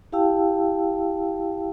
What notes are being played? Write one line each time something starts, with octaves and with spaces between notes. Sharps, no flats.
E4 G4 F5 G5 A5 E6